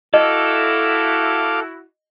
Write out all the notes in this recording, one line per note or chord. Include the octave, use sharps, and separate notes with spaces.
E4 F#4 A4 D#5 F5 D6